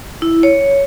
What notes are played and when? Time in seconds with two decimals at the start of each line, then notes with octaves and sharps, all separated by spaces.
0.22 E4
0.43 C#5